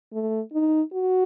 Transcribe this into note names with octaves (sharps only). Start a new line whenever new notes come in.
A3
D#4
F#4